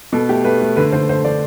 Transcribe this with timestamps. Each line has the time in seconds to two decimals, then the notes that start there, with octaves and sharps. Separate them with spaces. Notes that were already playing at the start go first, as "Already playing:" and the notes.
0.12 B2 A4
0.29 A3 G4
0.44 A3 B4
0.61 A3
0.76 D3 B4
0.92 D3 C5
1.09 D3 C5
1.24 D3 D5